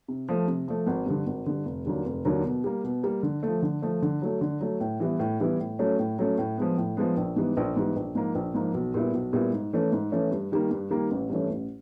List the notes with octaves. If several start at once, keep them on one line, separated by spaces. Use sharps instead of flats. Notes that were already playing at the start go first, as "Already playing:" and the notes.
C3
F3 A3
C3
F3 A3
G#1
G2 D3
G#1
G2 D3
F1
D#2 D3 F#3 A#3
F1
D#2 D3 F#3 A#3
B2
G3 A#3
B2
G3 A#3
D3
F3 A3
D3
F3 A3
D3
F#3 A3
D3
F#3 A3
A2
E3 G3 B3 E4
A2
E3 G3 B3 E4
A2
F#3 A3 C#4
A2
F#3 A3 C#4
A2
F3 G#3 B3
A2
F3 G#3 B3
A#1
G#2 E3 G3 B3
A#1
G#2 E3 G3 B3
A#1
G#2 F3 A#3
A#1
G#2 F3 A#3
B1
A#2 G3 B3 E4
B1
A#2 G3 B3 E4
G#2
E3 A3 C#4
G#2
E3 A3 C#4
G2
D#3 G3 A#3
G2
D#3 G3 A#3
A1
G2 E3 A3 C#4
A1